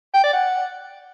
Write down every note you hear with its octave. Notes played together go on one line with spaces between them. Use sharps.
G5
D5
F#5